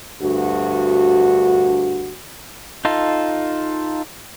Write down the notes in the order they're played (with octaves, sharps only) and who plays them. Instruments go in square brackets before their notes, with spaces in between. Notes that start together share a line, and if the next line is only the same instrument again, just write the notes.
[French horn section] D2 G2 F#4
[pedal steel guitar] D#4 F4 A4